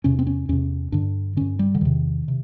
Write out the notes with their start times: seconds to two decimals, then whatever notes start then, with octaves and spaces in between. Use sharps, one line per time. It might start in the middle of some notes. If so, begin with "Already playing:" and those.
0.04 E2 C3 C#4
0.19 C4
0.27 C#4
0.49 E2 C3 C#4
0.92 G2 D3 D4
1.37 G2 D3 C#4
1.59 G3
1.75 D3
1.81 E2 C3 D#3
2.28 C3